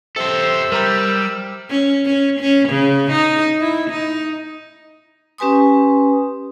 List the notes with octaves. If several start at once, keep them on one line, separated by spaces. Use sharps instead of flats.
C3 A4 C5 E6
G3 A#4 A#5 G6
C#4
C#4
C#4
C#3
D#4
E4
D#4
C#4 G4 B4 G#5 C6 D#6